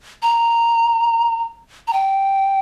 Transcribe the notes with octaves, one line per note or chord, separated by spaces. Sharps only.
A#5
A#5
G5